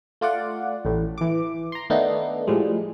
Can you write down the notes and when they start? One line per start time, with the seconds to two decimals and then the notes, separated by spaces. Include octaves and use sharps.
0.21 A3 F4 D5 F#5
0.85 A1 A2
1.18 E3 D6
1.72 A#5 C6
1.90 D#3 A3 B3 D4 D#4
2.47 A2 F3 G3 G#3